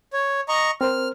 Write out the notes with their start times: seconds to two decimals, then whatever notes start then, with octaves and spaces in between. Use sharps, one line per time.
0.13 C#5
0.49 D#5 A#5 C#6
0.81 C4 A#4 C5 F6